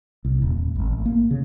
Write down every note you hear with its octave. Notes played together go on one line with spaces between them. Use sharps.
C2
D#1
D#1
G#1
A1
A#3
C#3